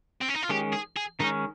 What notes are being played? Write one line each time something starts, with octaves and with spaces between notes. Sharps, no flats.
C4
C#4
D#4
F4
D#3 G#3 C#4 G4
G#4
G#4
D#3 G#3 C#4 D#4